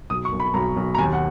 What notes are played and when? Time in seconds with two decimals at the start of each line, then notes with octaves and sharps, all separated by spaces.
0.10 B1 D#6
0.25 C#6
0.32 B1
0.40 B5
0.54 B1 A#5
0.76 B1
0.95 A#5
0.98 D#2 G#5
1.13 F#5